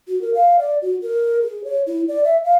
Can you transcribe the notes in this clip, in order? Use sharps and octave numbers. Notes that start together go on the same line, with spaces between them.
F#4
A#4
F5
D5
F#4
A#4
G#4
C#5
E4
D5
E5
F5